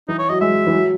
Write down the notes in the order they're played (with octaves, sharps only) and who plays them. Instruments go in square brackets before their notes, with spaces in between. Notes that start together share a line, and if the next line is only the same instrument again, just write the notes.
[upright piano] E3 [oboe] D#4
[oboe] C#5
[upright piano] F#3 [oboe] D#5
[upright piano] G#3 [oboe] E5
[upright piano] E3
F#3